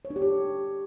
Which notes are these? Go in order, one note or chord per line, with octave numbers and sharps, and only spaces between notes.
C#5
D4
G4
C#5